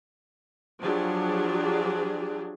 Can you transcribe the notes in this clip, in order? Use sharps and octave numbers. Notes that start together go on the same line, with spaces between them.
F3 F#3 D4 G4 G#4